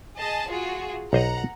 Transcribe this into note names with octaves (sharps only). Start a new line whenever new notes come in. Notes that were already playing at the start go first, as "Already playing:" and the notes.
G#4 D#5 A5
F4 F#4 G#4
B1 C5 D#5 F#5 A#5